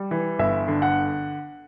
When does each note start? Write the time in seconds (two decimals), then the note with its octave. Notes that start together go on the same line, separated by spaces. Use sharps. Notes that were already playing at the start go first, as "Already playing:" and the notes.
Already playing: G3
0.11 E3
0.39 G1 E5
0.68 D3
0.82 F#5